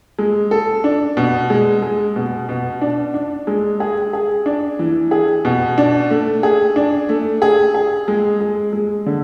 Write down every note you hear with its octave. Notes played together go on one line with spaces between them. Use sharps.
G#3
A4
D4
B2
G#3
G#3
B2
B2
D4
D4
G#3
G#4
G#4
D4
E3
G#4
B2
D4
A3
G#4
D4
A3
G#4
G#4
G#3
G#3
G#3
D3